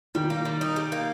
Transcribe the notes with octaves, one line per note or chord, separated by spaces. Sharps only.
D#3 G3
A#3
G3
D#4
G3
A#3